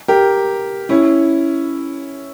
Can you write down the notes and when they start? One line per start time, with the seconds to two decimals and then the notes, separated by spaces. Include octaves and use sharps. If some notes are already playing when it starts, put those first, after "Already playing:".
0.08 G4 A#4
0.89 C#4 E4